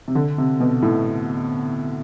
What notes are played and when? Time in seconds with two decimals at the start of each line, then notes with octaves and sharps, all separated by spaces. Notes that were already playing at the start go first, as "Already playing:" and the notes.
0.08 C3
0.15 D3
0.38 C3
0.60 B2
0.82 A2